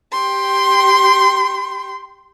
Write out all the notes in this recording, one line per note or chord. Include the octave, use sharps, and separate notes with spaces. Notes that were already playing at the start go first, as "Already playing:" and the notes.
G4 G5 C6